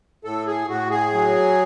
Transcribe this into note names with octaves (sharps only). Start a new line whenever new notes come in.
A2 A4
G#4
A2 F#4
G#4
F#3